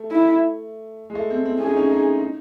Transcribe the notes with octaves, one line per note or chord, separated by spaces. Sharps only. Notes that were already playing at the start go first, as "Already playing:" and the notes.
Already playing: A3
E4
G#3
A3
C4
C4
C#4 G#4
D#4
C#4
D#4
D#4